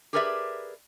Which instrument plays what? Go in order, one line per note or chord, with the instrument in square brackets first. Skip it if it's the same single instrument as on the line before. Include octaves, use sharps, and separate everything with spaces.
[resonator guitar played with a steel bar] G4 G#4 A#4 B4 D5 E5